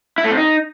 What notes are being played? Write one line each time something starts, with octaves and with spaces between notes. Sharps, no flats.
E4
A3
C3
D#4